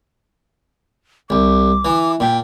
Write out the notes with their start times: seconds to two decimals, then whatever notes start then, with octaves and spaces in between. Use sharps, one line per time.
1.30 C2 D6
1.85 E3
2.20 A#2 G5